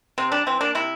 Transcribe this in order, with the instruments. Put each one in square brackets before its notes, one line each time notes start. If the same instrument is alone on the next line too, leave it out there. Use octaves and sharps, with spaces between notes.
[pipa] C3 C4
G3 D4
E3 C4
A#3 D4
C3 E4